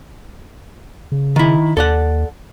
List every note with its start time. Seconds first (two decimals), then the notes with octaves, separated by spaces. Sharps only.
1.12 C#3
1.36 D#3 E4
1.77 D#2 A4 D5 F#5